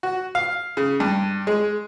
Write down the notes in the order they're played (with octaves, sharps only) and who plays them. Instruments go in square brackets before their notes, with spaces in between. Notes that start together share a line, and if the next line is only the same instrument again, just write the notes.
[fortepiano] F#4
F5
C#3
G2
G#3